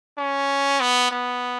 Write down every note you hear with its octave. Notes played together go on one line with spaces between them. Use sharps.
C#4
B3
B3